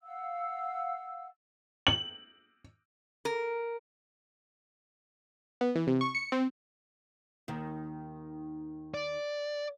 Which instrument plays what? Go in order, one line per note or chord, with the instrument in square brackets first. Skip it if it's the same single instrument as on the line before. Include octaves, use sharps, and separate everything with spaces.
[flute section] F5 F#5 E6
[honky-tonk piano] F#7
[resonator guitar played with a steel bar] A#4
[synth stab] B3
E3
C3
C#6
C#7
C4
[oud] D#2 D#3
[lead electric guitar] D5